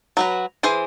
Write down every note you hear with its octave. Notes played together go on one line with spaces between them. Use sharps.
F#3 F#4 B4
E3 G#4 C5 G#5